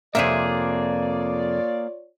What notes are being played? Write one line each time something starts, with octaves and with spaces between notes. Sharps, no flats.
F2 C3 A#3 F4 G#4 C#5 D5 E5